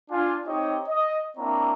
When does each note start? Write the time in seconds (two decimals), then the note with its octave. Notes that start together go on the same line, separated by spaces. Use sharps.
0.10 D4 F4 G#5
0.46 C4 D#4 G4 C#5 D#5
0.87 D#5
1.37 A#3 C4 D4 E4 C#5 A#5